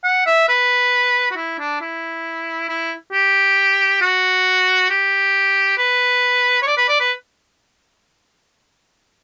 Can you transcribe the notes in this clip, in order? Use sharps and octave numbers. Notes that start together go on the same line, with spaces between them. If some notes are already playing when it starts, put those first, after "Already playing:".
F#5
E5
B4
F#4
E4
D4
E4
E4
G4
F#4
G4
B4
C#5
D5
B4
D5
B4